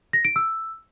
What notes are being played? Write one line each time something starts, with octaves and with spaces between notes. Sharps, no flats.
A#6
D7
E6